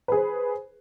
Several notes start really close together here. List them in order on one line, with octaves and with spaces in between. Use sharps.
B4 G#4 C5